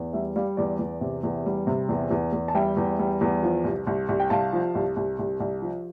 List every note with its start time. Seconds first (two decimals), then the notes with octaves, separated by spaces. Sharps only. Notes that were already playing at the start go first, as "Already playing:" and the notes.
Already playing: E2
0.13 G3 E5
0.36 G3 D5 F5
0.57 E2 D5
0.79 E2
1.01 C3
1.23 E2
1.46 G3
1.67 C3
1.89 E2
2.11 E2
2.33 E2
2.48 A5
2.55 G3 E5 G5
2.77 E2
2.99 G3
3.21 E2
3.43 F3
3.64 C2
3.87 C2
4.09 C2
4.20 G5
4.30 C2 F5 A5
4.53 F3
4.75 C2
4.96 C2
5.19 C2
5.40 C2
5.62 F3